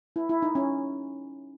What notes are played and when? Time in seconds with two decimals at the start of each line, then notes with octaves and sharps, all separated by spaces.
0.16 E4
0.29 E4
0.42 D#4
0.55 C#4